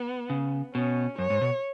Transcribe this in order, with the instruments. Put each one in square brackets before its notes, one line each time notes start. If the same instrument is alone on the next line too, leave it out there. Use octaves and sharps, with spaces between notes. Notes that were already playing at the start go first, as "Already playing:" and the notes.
Already playing: [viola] B3
[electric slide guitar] C#3
[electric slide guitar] B2 [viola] C#4
[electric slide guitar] F#2 [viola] C#5
[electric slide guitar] G#2
B2